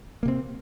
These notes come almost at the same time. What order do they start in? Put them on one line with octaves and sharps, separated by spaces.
A#3 C3 C4